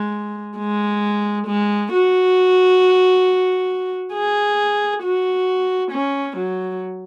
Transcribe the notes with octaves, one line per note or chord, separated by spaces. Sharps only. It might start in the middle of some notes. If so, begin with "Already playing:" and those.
Already playing: G#3
G#3
G#3
F#4
G#4
F#4
C#4
F#3